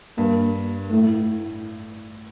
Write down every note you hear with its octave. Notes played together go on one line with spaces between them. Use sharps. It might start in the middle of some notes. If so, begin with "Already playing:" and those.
G2 A#3
A2 A3
A2